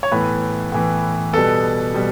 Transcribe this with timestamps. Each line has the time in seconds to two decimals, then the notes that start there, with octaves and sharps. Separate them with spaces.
0.03 C#5
0.12 A2 E3 B3 B4
0.72 A2 E3 B3
1.33 B2 G3 B3 A4
1.94 B2 G3